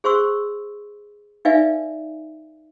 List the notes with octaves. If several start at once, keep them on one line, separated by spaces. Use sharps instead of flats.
G#4 C5 C6 C#6 E6
D#4 B4 D5 E5 F5 G#5